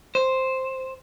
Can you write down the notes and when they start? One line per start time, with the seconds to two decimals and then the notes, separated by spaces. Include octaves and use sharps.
0.15 C5